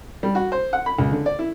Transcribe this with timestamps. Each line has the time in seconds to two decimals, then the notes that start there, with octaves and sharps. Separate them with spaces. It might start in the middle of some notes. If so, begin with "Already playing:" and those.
0.23 G3
0.35 F#4
0.52 C5
0.73 F#5
0.86 B5
0.98 C#2
1.12 D3
1.26 D5
1.39 E4